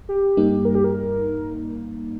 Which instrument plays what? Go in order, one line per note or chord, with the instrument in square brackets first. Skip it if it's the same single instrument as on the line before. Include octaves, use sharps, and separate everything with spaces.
[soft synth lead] G4
[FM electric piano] G2 G3 A#3 D#4
[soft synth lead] A#4
G4
A#4